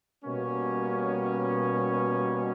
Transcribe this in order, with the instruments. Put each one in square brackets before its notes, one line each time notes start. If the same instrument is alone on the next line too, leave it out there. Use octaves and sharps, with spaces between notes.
[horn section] B2 G3 A#3 C#4